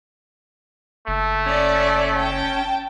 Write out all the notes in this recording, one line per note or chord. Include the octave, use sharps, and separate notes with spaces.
F#1 A3
C#4 D5
G5 A5